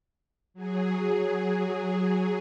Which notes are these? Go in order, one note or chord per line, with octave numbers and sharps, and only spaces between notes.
F#3 G#4